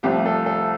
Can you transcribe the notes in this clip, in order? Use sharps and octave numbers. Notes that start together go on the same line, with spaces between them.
C2 C3 F3 A3 C4 G4
A4
A4